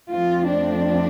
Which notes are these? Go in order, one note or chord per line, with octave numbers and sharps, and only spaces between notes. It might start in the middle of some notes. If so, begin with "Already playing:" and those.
F2 F3 A3 C4 F4
D4